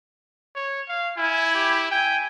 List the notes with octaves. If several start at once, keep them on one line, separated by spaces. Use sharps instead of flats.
C#5
F5
E4 G#5
G4
G5 G#5